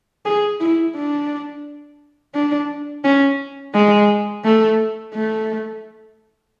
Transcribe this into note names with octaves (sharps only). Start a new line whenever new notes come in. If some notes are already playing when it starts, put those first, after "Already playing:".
G#4
E4
D4
D4
C#4
G#3
A3
A3